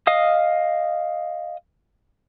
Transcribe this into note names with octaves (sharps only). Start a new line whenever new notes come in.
D#5 F5 D#6